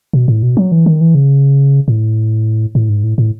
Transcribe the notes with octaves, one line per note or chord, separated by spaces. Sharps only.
B2
A2
B2
F#3
E3
D#3
E3
C#3
A2
A2
G#2
A2
A2